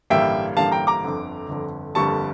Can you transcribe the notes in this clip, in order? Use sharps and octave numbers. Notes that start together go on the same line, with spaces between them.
A1 G2 D3 G3 A#3 E5 G5
A1 G2 D3 G3 A#3 F5 A5
G5 A#5
A#5 D6
G1 F2 D3
G1 F2 D3
G1 F2 D3 G3 A#3 A5 C#6